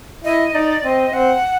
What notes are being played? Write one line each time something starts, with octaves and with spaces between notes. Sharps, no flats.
E4 D#5
D#4 D5
C4 D#5
C4 F#5